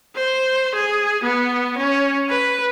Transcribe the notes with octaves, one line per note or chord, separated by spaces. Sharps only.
C5
G#4
B3
C#4
B4